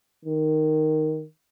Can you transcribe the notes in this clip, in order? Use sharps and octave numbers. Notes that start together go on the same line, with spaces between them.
D#3